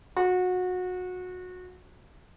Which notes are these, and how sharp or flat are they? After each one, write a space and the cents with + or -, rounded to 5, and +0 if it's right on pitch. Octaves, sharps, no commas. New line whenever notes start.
F#4 -25